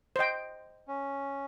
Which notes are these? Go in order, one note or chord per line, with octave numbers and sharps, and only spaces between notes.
C5 D#5 G5
C#4